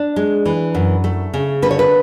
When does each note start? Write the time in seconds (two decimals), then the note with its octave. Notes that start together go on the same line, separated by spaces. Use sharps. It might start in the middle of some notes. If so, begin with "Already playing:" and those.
Already playing: D4
0.16 G#3
0.46 E3
0.75 F#2
1.04 A3
1.34 C#3
1.62 D3 B4
1.71 C#5
1.79 B4